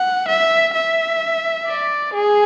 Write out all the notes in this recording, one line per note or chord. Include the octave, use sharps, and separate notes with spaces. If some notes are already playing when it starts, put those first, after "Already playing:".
Already playing: F#5
E5
E5
D5
G#4